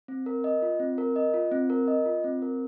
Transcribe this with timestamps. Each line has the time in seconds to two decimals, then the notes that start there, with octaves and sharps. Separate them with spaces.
0.08 C4
0.26 A#4
0.44 D#5
0.62 F4
0.80 C4
0.98 A#4
1.16 D#5
1.34 F4
1.52 C4
1.70 A#4
1.88 D#5
2.06 F4
2.24 C4
2.42 A#4